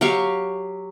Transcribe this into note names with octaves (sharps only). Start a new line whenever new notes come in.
F#3 G4 F5 C#6